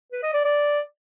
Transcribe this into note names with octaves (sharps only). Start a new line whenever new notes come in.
B4
D#5
D5
D5